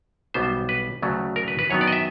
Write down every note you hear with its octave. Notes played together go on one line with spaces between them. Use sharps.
B1 B2 G3 B3 C5
B4
D2 C#3 F#3 A3
A#4
B4
B4
F#2 D#3 F#3 B3 C#5
D5
D#5
E5